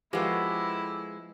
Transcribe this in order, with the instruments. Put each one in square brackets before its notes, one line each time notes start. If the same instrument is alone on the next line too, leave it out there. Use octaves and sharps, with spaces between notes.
[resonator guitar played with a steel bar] F3 B3 [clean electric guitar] G#3 [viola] E4 [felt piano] G4 A4 C#6